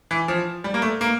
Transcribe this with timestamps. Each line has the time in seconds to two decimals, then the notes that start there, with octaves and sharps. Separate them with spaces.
0.11 E3
0.28 F3
0.64 G3
0.74 A#3
0.82 A3
1.01 A#3